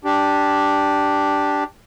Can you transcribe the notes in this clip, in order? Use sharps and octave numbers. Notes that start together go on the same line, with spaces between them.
D4 G4